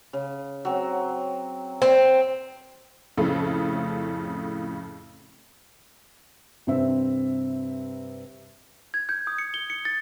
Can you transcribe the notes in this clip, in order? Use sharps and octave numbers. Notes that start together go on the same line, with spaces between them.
C#3
F#3 C4
C4
F2 A2 C#3 A3
G2 C3 C4 E5
G#6
G6
D#6
C#7
G7
C#7
A6